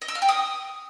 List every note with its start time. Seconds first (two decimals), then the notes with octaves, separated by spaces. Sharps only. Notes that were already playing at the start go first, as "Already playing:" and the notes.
0.02 D#5
0.08 E6
0.15 F5
0.22 G5
0.29 D#6